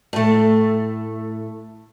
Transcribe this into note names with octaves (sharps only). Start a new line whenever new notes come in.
A2 A3